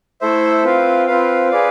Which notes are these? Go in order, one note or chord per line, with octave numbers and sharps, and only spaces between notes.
A3 E4 A4 C5 E5
C4 F4 B4 F5
C4 F4 B4 F5
G#4 B4 D5 F5